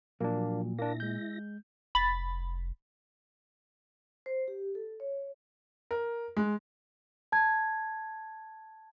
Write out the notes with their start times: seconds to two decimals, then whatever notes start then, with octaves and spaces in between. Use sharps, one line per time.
0.21 A#2 F3 F#3 A#3 D4
0.79 A#3 D4 E4 A#6
1.00 G#3 G6
1.95 F1 B5 A6
4.26 C5
4.48 G4
4.75 A4
5.00 C#5
5.91 A#4
6.37 G#3
7.32 A5 G#6